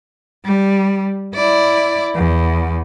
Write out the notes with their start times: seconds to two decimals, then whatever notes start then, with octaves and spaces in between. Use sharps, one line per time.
0.45 G3
1.35 E4 D5
2.15 E2